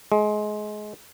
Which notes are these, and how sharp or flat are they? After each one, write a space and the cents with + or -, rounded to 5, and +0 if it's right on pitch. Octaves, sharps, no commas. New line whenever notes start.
G#3 +25